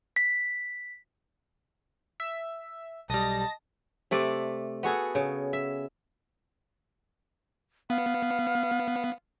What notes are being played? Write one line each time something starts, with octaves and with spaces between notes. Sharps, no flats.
B6
E5
B1 G3 D#5 A5 A#6
C3 A3 D5
B3 F#4 G#4 A4
C#3
E5
B3 F5